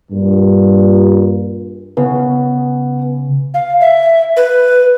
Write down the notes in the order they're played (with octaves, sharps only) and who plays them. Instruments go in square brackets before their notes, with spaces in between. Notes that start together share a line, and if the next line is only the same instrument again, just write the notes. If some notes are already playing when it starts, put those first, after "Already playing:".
[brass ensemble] G2 A#2
[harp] C#3 [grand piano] B3
[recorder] F5
E5
B4